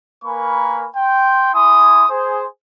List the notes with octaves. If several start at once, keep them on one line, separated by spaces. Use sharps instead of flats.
A#3 A#4 B4 G#5 B5 C#6
G5 C6
E4 G#5 C6 D#6
G#4 C5